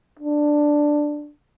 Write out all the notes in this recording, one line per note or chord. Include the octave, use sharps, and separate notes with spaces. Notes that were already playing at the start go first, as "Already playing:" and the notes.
D4